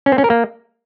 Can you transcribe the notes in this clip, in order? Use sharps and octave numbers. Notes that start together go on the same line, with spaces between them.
C#4
C4
C#4
A#4
A#3